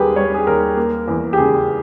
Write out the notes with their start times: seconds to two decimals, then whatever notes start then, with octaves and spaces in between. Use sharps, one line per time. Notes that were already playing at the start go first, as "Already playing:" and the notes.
Already playing: D#2 G3 G4 G#4 A#4 B4
0.16 G3 C#5
0.34 G#4
0.46 D#2 A#4
0.77 A#3
1.08 E2
1.33 G4
1.37 C#3 G#4